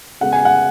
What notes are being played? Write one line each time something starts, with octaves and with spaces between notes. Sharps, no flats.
C#3 G#3 B3 F#5
G#5
F#5